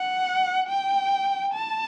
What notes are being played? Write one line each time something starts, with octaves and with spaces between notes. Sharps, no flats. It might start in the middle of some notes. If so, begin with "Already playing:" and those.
Already playing: F#5
G5
A5